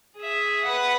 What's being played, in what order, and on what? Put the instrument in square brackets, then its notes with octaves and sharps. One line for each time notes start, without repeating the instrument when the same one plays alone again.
[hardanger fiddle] G#4 E5
B4 F#5